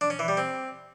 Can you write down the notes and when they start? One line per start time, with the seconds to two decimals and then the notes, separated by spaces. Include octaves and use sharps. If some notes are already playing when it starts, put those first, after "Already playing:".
0.01 D4
0.10 C#4
0.19 E3
0.28 G3
0.37 C4